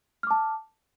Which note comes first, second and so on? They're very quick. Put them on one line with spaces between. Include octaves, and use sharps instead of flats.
F6 D6 A5